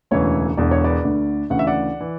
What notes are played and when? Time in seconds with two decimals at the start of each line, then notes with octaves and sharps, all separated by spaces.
0.11 E1 D2 C#3 E3 C#5
0.57 E1 E2 D3 D5
0.71 C#5
0.84 B4 D5
1.04 D2 D3
1.50 D2 C#3 E3 F#5
1.59 E5
1.67 D5 F#5
2.00 E3